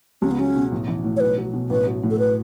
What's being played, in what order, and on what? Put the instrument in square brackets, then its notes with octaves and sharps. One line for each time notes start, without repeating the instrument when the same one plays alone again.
[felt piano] C#2 [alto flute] C#4
[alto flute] B3
[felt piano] F#3 [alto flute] C#4
[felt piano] B2
A1
E3
A2
[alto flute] C#5
[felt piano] B1 [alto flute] B4
[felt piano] F#3
B2
[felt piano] A1 [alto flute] B4
[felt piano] F#3
A2
[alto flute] A4
B4